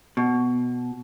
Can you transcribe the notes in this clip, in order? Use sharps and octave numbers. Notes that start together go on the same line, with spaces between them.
B2